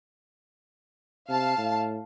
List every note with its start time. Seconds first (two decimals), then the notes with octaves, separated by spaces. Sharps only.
1.29 C3 F5 A5
1.58 A2